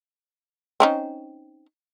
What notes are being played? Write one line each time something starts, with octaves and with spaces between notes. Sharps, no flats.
C4 C#4 D#4